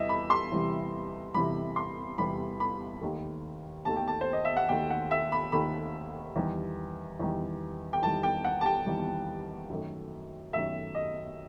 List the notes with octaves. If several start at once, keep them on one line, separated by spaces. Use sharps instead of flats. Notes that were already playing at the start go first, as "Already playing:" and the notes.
Already playing: E2 C3 E3 G3 D#5 E5
B5
C6
E2 C3 E3 G3
E2 C3 E3 G3 B5
C6
E2 C3 E3 G3 B5
B5
D#2 D#3 A3
D#2 D#3 A3 A5
G5
A5
C5
D#5
E5
F#5
D#2 D#3 A3 G5
F#5
E5
B5
D#2 D#3 A3 B5
E2 D#3 G3
E2 D#3 G3
G5
E2 D#3 G3 A5
G5
F#5
A5
G5
E2 D#3 G3
F#2 D#3 A3
F#2 D#3 A3 E5
D#5